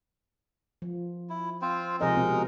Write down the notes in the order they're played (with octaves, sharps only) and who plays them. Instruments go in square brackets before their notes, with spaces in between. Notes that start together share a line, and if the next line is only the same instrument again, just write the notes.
[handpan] F3
[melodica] E4
C4 F4 C5
[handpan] C3 F3 D#5 [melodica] G#3 D#4 A#4
[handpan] B2 C4